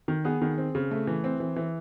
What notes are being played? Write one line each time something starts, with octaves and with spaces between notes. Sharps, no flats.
D#3
B3 G#4
D#3
C4
C#3
A3
E3
C4
E3
E3